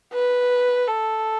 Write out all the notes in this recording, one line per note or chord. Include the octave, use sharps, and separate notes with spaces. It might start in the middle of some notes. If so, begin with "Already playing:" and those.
B4
A4